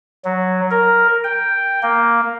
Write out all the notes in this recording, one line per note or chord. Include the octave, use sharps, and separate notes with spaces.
F#3
A#4
G5
A#3